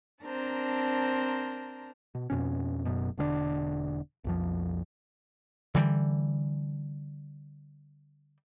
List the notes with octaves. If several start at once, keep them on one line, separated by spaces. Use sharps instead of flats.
C4 D4 A#4 C5 A5 A#5
B2
F2 B2 C#4
F#1 F#2 B2
E1 D3 A#3 D4
B1 F2 F3
D3 E3 G3